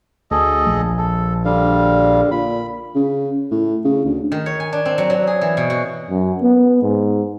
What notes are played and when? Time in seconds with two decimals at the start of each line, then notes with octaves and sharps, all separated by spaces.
0.31 D2 G#4 A4 D#5
0.66 A#1
0.98 A4
1.45 D3 G3 F5
2.31 A#2 B5
2.95 C#3
3.51 A2
3.85 C#3
4.05 D2
4.32 D#3
4.46 C#5
4.60 G#5
4.73 D4
4.85 C4
4.98 F#3
5.10 F#3
5.27 G#4
5.41 E3
5.57 B2
5.70 F#4
6.10 F#2
6.42 B3
6.82 G#2